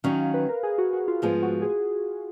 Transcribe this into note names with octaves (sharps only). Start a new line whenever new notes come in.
D#3 F#3 C#4 F5
B4
A#4
G#4
F#4
F#4
F4
G#2 F3 G#3 B3 F4
F#4
G#4